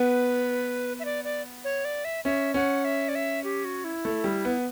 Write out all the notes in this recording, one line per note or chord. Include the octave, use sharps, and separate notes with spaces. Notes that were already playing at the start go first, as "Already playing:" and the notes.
Already playing: B3 B4
E5
D5
D5
C#5
D5
E5
C#4 E5
C#4 F#5
E5
D5
E5
G4
F#4
E4
A3
G3
B3